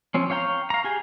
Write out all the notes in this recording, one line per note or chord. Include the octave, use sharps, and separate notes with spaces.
F3 C4 C#4
C#5 F5 G5 A#5
F5 A#5
G4 G#4 G#5